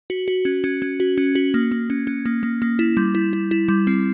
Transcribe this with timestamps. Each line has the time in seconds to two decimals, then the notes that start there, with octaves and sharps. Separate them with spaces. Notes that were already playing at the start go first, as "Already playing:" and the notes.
0.10 F#4
0.28 F#4
0.45 C#4
0.64 C#4
0.82 C#4
1.00 F#4
1.18 C#4
1.35 F#4
1.54 A#3
1.71 A#3
1.90 C#4
2.07 C#4
2.26 A#3
2.43 A#3
2.62 A#3
2.79 E4
2.97 G3
3.15 E4
3.33 E4
3.51 E4
3.68 G3
3.87 C4